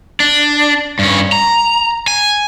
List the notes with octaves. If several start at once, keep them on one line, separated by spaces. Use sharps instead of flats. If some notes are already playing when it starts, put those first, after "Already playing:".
D4
G2 C#4
A#5
G#5